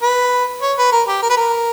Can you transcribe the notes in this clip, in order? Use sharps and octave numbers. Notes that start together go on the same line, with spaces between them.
B4
C#5
B4
A#4
G4
A#4
B4
A#4